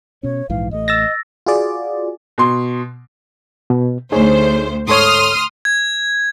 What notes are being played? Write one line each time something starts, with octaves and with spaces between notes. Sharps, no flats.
B2 C#4 C#5
A#1 G#2 E3 F5
A1 A3 D#5
E6 A6 A#6
F4 F#4 G#4 D5
B2 C6
B2
D2 D#4 G#4 C5 C#5
G#2 A4 C#5 C6 D#6 F6
G#6